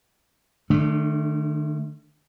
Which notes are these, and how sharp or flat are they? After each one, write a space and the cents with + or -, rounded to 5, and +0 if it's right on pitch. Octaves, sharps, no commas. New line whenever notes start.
D#3 -45 A3 -5 D4 +0